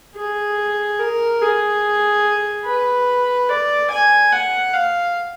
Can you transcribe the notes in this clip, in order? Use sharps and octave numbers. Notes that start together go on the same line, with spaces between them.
G#4
A#4
G#4
B4
D5
G#5
F#5
F5